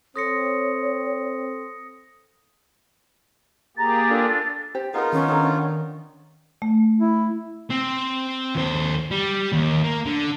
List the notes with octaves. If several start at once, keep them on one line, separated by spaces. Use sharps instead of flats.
C4 A4 C#5 C6 D#6 A#6 C#7
A#3 G4 G#4 A#5 A6
D4 F4 A4
G4 C5 G5
B3 D#4 F4 G#4 A#4
D#3 C#4
D4 A4 A#5
D4 D5 F#5
A3
E4
C4
D#2 C5
G3
D#2
A#3
D3